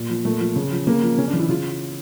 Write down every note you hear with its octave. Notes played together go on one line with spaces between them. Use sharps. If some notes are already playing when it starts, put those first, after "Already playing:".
Already playing: A#2
F3
A#2 A3
F3
C#3
F3
C#3 A#3
F3
C#3 C#4
D4
E3
E4
C#3 F4